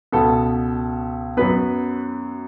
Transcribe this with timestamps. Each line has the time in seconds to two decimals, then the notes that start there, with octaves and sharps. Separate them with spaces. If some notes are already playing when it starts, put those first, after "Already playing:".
0.12 C#2 B2 B3 A4
1.37 F#2 F#3 B3 B4